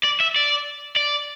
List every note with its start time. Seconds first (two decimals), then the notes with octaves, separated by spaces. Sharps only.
0.05 D5
0.21 E5
0.36 D5
0.96 D5